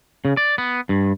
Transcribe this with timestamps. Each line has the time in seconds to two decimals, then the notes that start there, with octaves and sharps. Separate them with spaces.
0.25 C#3
0.37 D5
0.58 B3
0.89 G2